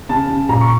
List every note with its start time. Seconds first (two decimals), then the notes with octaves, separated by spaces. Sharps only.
0.09 C#3 A5
0.29 C#3
0.49 A#2 A#5
0.61 C#6